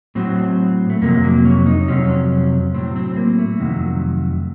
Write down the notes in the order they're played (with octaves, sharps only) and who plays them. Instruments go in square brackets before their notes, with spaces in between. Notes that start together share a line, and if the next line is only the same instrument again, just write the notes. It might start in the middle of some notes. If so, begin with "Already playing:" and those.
[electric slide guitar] A2 F#3 C4
A3
F2 C3 F#3 A#3
A#3
C#4
D#4
F2 C3 F#3 C#4
A2 F#3 C4
C4
A#3
A3
F2 C3 D#3 F#3